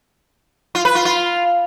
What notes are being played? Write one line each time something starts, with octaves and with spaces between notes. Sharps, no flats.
F4
B4
F4
F4